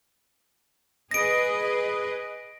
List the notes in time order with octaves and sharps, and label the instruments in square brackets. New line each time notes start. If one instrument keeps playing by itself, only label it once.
[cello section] G#4 B4 D#5 [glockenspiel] A#6 D7